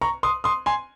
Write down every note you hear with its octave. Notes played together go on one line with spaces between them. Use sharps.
A#5 C#6
C6 D#6
C6 D#6
G#5 C6